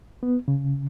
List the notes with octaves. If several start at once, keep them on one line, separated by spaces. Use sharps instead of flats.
B3
C#3